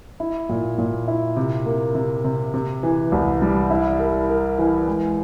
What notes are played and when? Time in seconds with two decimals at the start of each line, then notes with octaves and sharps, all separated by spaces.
0.20 E4
0.49 A#2
0.78 A#2
1.08 E4
1.36 C3
1.66 A#3
1.95 C3
2.24 C3
2.54 C3
2.83 E3
3.12 C2
3.42 G3
3.70 E4
4.00 A#4
4.29 A#4
4.59 E3
4.87 G#3